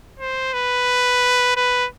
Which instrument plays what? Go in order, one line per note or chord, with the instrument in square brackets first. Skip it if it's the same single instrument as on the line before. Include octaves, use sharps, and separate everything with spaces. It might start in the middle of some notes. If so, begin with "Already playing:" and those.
[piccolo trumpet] C5
B4
B4